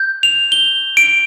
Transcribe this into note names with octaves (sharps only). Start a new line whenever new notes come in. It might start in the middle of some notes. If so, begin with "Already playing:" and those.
Already playing: G6
F7
G7
D7